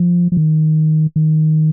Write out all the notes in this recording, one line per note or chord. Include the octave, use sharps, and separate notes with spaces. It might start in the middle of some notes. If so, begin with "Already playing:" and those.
Already playing: F3
F3
D#3
D#3